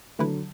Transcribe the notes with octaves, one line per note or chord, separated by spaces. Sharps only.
D3 E3 F#3 A3 E4 B4